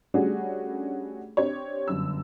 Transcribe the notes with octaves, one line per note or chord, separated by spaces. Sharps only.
G3 A3 C#4 D4 F#4 G#4
C4 D4 G4 C#5
G1 F#2 E6